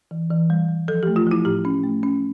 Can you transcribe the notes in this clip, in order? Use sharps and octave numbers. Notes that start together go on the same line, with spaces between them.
E3
E3
G3
G3
F3 A4
A3 G4
F4
F3 E4
A2 G4
C#4
A3
C#4